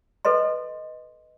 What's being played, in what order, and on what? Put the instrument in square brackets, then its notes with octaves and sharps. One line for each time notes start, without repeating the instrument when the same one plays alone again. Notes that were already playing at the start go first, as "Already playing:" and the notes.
[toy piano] A4 B4 D#5 C6